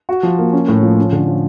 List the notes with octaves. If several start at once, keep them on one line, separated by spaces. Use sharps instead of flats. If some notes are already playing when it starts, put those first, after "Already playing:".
F#4
F3
A#3
C#4
A2
F3
C#4
D3
F3